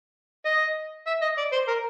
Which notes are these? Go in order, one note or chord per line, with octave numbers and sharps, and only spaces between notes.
D#5
E5
D#5
D5
C5
A#4